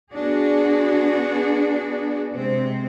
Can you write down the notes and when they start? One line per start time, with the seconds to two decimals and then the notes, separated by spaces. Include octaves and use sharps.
0.14 B3 D4 F#4 G#4
2.32 C3 G#3 C4